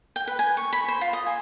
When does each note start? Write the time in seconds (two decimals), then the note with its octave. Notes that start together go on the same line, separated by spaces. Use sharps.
0.16 G5
0.28 B4
0.39 G#5
0.57 C#6
0.73 B5
0.88 C5
1.01 F4
1.13 D#5
1.26 G#5